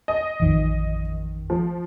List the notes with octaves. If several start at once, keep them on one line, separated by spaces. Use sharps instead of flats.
D#5
A1 F2 D#3 E3
F3